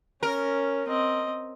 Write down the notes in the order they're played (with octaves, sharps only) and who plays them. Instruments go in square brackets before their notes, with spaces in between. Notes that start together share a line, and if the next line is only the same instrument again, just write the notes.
[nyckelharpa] C#4 [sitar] A#4
[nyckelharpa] C4 D#5